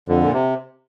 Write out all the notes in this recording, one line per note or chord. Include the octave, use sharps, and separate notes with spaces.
F2 D3
A#2
C3